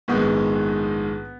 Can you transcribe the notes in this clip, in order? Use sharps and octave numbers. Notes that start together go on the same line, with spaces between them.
A#1 G#2 D#3 G#3 B3